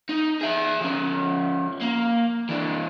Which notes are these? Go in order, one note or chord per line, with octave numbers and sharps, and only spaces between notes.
D#4
G#4 E5
F3 C#4
A#3
E3 D4